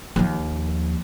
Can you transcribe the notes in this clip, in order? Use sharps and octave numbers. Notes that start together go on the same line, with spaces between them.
D#2 F3